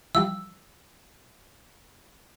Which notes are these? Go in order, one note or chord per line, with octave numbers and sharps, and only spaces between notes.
E3 F3 G3 E6